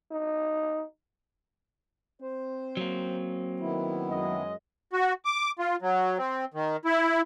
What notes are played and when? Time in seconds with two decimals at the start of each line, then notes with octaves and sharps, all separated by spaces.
0.11 D#4
2.22 C4 C5
2.77 F#3 A#3
3.60 D#3 B3 E4
4.09 F#2 G#3 D#5
4.93 F#4
5.25 D6
5.59 F4
5.82 F#3
6.18 C4
6.54 D#3
6.85 E4